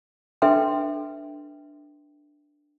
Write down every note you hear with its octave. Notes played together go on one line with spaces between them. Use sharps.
D4 A4 B4 E5 G5 C6